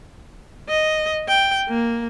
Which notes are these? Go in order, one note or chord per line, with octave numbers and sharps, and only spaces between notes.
D#5
G5
A#3